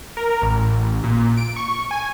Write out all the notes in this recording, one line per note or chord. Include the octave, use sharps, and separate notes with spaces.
A#4
A1
A#2
D7
C#6
G#5